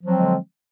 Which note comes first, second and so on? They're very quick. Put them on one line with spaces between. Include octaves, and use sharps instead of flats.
F3 F#3 C4 G#3 D3